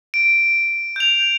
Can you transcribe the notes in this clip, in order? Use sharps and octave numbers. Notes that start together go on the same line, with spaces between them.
D7
G6 F7